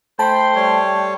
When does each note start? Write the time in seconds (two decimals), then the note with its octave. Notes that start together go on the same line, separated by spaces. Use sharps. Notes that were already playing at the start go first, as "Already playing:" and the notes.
0.19 A3 C5 G5 A5 B5 C6
0.55 G3 C#5